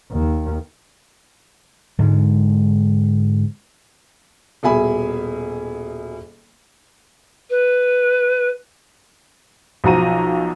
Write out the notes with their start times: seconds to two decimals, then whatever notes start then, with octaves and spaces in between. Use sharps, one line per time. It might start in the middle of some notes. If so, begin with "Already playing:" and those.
0.12 D#2
1.99 G#2 D3 G#3
4.63 D#1 B2 G#4 E5 G#5 B5
7.49 B4
9.84 B1 F3 F#4 A#5 D#7